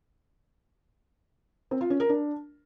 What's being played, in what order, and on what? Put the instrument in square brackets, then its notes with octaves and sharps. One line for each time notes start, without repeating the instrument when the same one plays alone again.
[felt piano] C4
F4
C#4
A#4
D4